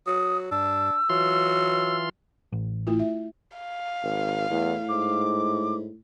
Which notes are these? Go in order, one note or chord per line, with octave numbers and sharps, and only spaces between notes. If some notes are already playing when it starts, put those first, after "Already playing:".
F#3 D#6
G2 D4 E6
E3 F#3 F4 C6
A1
A3 E4 F4
E5
F5
G#1
E2 A2
G#2 D6